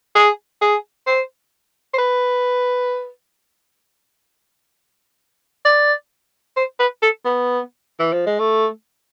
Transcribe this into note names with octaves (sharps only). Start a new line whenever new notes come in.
G#4
G#4
C5
C5
B4
D5
C5
B4
A4
B3
E3
F3
G#3
A3